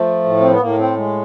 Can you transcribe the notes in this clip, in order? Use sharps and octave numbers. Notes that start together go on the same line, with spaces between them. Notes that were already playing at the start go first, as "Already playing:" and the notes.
Already playing: F3 A3
A2
C4
B3
A2 A#3
C4
G#3